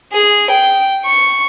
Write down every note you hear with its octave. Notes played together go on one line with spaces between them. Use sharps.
G#4
G5
C#6